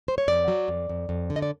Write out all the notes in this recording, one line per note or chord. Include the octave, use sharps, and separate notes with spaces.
C5
C#5
F2 D5
F#3
F2
F2
F2
D3
D#5
D5